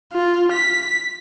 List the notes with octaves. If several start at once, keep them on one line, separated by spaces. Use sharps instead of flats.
F4
B6